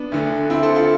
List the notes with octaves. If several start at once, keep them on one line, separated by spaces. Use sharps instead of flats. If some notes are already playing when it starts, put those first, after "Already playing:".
Already playing: B3 D4
D2 D3
C4 E4
A4 C5
F4 A4